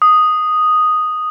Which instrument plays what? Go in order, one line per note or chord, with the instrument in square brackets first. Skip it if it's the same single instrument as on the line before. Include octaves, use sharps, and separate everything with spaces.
[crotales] D#6